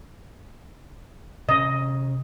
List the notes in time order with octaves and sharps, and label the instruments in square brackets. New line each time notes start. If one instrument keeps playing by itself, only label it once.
[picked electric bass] C3 C#4 [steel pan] D#5